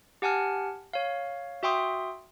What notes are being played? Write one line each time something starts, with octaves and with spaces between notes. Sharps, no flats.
G4 F#5 G#5 A5 F6
C#5 F5
F#4 E5 G5 C6 D#6